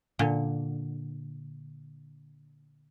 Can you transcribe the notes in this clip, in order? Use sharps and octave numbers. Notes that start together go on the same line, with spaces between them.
A#2 D3